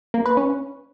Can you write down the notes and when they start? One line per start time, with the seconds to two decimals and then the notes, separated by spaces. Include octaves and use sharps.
0.14 A#3
0.25 B4
0.37 C#4